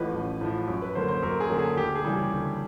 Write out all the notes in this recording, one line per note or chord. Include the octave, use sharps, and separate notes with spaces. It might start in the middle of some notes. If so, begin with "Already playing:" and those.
Already playing: A1 A2 F3 B4 D#5
A1
A2 F3
F#2
B4
D3 F#3 A#3 C5
C5
F#2 A#4
G#4
D3 F#3 A#3 A4
G#4
D2 G4
G#4
C#3 E3 G3
G4
D2